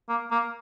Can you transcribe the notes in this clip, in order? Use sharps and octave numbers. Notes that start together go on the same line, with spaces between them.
A#3
A#3